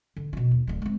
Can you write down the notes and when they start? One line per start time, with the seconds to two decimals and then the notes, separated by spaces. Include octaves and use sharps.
0.16 D3
0.33 B2 F4
0.51 D#2
0.67 D1 D3
0.82 G#3 C4